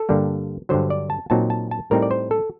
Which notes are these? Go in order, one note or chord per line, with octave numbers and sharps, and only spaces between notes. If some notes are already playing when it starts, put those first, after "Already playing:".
Already playing: A4
G2 D3 G3 A#3
G2 D3 F#3 C5
D5
A5
A#2 F#3 C4 D#4 A5
A5
A5
A2 G3 C4 D#4 A#4
D5
C5
A4